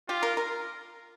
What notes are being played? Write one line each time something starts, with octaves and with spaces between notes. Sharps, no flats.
F4 G4
A#4
A#4